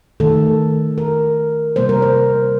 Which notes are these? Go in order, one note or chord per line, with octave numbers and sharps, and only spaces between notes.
D#3 A3 A4
A#4
C3 G3 A#3 C5
A#4
C5